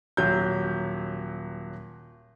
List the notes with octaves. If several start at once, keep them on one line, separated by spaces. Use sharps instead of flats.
D#1 F#3 G6